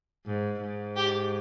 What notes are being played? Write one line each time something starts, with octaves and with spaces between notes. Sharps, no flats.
G#2
G#2
G4